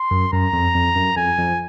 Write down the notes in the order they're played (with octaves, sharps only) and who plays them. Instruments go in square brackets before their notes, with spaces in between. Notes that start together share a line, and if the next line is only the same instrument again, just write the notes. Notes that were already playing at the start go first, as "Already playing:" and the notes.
Already playing: [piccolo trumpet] C6
[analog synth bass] F#2
[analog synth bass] F#2 [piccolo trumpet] A#5
[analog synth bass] F2
F2
F#2
[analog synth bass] F2 [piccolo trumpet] G#5
[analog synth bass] F2